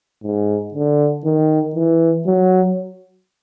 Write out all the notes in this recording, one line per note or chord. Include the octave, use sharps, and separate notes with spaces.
G#2
D3
D#3
E3
F#3